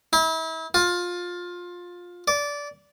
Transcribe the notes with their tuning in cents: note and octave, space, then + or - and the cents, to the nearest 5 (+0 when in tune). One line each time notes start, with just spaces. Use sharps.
E4 -35
F4 +20
D5 -15